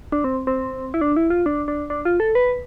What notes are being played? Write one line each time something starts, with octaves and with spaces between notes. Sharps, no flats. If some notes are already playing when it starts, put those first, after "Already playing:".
D4
C4
C4
E4
D4
E4
F4
D4
D4
D4
F4
A4
B4